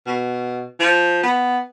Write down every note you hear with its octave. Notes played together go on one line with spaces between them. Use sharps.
B2
F3
B3